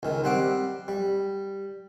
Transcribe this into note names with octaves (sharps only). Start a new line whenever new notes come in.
C#2 D#3
G3 C4 F#5 D6
G3